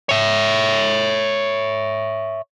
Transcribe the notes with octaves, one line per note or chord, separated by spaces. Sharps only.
C#5 E5